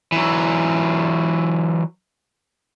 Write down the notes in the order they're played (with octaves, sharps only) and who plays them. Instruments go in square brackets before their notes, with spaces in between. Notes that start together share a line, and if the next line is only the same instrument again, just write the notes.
[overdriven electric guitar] E3 F#3